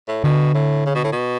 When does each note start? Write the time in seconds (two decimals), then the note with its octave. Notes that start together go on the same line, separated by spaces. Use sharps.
0.08 A2
0.24 B2 D3
0.54 A2
0.86 C#3
0.95 B2
1.04 A2
1.12 B2